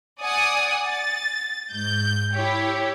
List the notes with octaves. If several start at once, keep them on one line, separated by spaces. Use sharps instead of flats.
D5 F#5 G#5 D#6
A6
G#2 G6
E4 G4 C#5